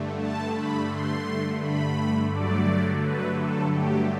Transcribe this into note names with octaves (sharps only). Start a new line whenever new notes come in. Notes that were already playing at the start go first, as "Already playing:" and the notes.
Already playing: G2 D3 A3
A5
B5
C6
B5
G2 D3 F#3 A3 D5
B4
A4
G4